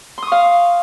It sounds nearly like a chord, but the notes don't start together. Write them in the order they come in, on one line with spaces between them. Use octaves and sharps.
C6 D#6 C#6 F5